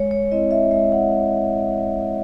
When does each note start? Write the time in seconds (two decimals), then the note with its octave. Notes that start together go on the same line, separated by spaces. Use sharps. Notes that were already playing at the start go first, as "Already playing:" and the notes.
Already playing: G#3 C#5
0.11 C#5
0.31 C4 E4 D#5
0.51 E5
0.71 G#3 E5
0.92 F#5